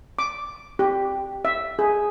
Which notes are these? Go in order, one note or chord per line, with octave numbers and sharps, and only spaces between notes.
D6
G4
E5
G#4